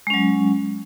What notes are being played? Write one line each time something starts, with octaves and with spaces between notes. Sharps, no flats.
F#3 G#3 C#4